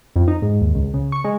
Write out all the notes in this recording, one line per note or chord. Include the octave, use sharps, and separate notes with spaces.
F2
D#4
G#2
D#2
C#2
C#3
C#6
G#3